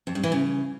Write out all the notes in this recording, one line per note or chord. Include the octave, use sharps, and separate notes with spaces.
F2
G2
E3
C#3